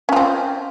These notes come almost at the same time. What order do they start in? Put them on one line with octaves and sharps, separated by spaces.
C#4 F4 C4